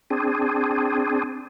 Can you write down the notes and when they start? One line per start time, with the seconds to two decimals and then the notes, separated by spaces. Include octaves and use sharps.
0.10 C4 D4 G#4